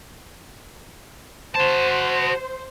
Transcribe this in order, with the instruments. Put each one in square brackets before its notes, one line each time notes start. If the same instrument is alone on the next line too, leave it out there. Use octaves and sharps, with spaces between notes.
[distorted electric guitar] F#4 A5 [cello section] C5